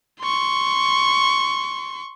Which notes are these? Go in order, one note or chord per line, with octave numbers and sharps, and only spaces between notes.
C6 C#6